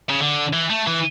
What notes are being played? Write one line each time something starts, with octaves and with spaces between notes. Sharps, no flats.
C#3
D3
E3
A3
E3